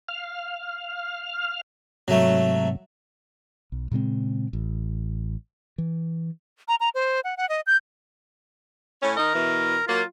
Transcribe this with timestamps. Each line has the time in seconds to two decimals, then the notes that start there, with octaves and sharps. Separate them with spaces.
0.08 F5 F6
2.08 G#2 C3 F#3 A3
3.72 B1
3.91 A#2 C#3 G#3 C4
4.53 A1
5.78 E3
6.68 A#5
6.80 A#5
6.95 C5
7.24 F#5
7.37 F#5
7.49 D#5
7.67 G6
9.01 A2 C#4
9.17 D#3 D#4 A#4 D#5
9.33 B2 E3
9.87 F#3 A#3 F4